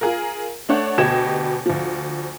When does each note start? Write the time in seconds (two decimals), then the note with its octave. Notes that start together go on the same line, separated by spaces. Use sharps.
0.01 F4 G#4 A#4
0.69 A3 D4 C#5 F#5
0.98 D2 B2 G4 D#5 G#6 E7
1.66 D2 F3